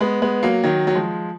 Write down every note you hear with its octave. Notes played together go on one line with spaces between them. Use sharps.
G#3 B3
G#3 B3
F#3 A#3
D#3 F#3
F#3
F3 G#3